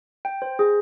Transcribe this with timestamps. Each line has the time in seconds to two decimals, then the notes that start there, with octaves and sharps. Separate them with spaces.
0.25 G5
0.42 C5
0.59 G#4